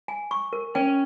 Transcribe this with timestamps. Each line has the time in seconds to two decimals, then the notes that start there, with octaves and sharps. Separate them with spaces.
0.08 G#5
0.31 C#6
0.53 A#4
0.75 C#4 G5